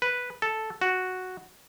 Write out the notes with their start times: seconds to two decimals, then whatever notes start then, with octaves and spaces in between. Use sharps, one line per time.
0.02 B4
0.42 A4
0.81 F#4